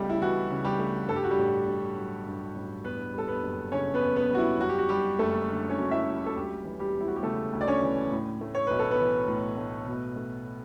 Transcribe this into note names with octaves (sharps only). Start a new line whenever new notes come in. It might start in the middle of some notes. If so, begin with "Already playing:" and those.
Already playing: C#2 C#3 G3 A3 B3 G4
E4
E3 F#4
C#3
G3 G4
A3
G2 A4
G4
F#4
G3 G4
A1
A1
F#3
G2
A1
E2 B3 B4
G3 A4
B3 B4
F#1
C#3 C#4 C#5
B3 B4
E2
B3 B4
G3 F#4
E4
F#2 F#4
G4
F#4
G3 G4
F#1 A3 A4
D3
C#4 C#5
F#2
E4 E5
G3
A4
D2 G3 G4
E3
G3 G4
E1
E4
F#4
G4
C#3 A3 A4
D2
D5
C#4 C#5
E3
A2
A3
C#5
B1 B4
A4
B3 B4
E3
A2
A3
B2
A3